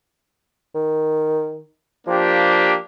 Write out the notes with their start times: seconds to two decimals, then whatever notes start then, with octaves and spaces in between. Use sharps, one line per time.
0.75 D#3
2.07 F3 A#3 D4 G4